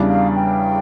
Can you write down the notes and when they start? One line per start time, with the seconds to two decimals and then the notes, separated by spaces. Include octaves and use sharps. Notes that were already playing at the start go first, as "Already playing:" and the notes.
Already playing: E2 C#3 G3 D4
0.09 F5
0.36 G5